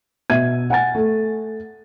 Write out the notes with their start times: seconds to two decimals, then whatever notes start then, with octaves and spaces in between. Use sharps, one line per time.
0.30 B2 E5 G#6 D#7
0.70 F#5 G#5 A6
0.95 A3 A4